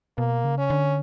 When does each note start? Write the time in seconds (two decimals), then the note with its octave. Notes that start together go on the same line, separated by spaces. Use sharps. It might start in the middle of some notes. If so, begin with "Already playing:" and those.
0.18 B2 A#3
0.44 C#3
0.58 C#4
0.70 D3